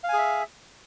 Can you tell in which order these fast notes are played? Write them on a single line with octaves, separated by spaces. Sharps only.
F5 G#5 G#4 E5